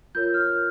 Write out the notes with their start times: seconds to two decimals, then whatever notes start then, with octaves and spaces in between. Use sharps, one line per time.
0.15 F4 A#4 C#5 G6
0.34 F6